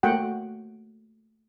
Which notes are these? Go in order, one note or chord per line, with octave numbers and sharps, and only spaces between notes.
A3 A#3 F#4 F#5 G5